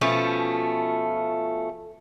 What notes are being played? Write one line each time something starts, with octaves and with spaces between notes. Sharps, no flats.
B2 F3 A3 C#4